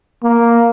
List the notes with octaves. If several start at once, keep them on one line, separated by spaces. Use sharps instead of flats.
A#3